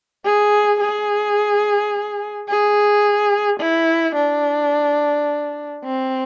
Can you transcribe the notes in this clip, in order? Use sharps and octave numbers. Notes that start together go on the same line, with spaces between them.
G#4
G#4
G#4
E4
D4
C4